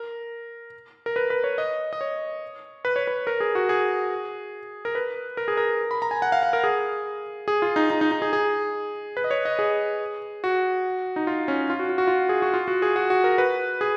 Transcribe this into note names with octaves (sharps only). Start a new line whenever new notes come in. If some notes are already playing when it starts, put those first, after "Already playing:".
Already playing: A#4
A#4
B4
B4
C#5
D#5
D#5
C#5
B4
C#5
B4
A#4
G#4
F#4
G#4
A#4
B4
A#4
G#4
A#4
B5
A#5
G#5
F#5
F5
F#5
A#4
G#4
G#4
F4
D#4
D#4
D#4
D#4
G#4
G#4
B4
D#5
C#5
D#5
G#4
F#4
D#4
F4
C#4
F4
F#4
F4
F#4
F4
G#4
F#4
F4
F#4
G#4
F#4
F#4
A#4
B4
G#4